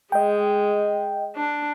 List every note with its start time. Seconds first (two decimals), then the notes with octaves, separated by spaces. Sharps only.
0.12 G#3 D#5 G5
1.36 D4